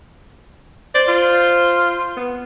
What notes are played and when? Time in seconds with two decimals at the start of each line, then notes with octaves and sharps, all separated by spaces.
0.95 C5 D5
1.08 F4
2.17 B3